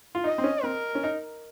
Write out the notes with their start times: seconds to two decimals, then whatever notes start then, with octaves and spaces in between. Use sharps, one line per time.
0.15 F4
0.24 D#4 D#5
0.38 C4
0.44 C#4
0.63 C4 A#4
0.95 C#4
1.04 D#4